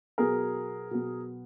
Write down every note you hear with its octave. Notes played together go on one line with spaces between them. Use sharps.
B2 F#3 B3 G#4 A#4
B2 F#3 B3